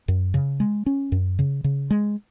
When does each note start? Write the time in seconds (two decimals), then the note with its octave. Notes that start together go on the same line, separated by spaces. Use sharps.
0.08 F#2
0.34 C#3
0.60 G#3
0.86 C#4
1.12 F#2
1.39 C#3
1.64 C#3
1.90 G#3